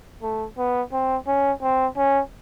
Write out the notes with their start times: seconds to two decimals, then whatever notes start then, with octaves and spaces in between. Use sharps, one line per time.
0.22 A3
0.57 B3
0.92 C4
1.27 C#4
1.62 C4
1.97 C#4